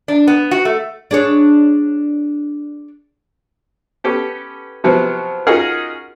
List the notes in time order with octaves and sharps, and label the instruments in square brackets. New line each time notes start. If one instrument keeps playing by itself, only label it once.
[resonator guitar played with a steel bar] D4
B3
F#4
A3
[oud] D4 G#4 C#5
[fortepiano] B3 C#4 G4 A4
C3 F3 F#3 B3 C4
C#4 D#4 F4 F#4 G#4 A#4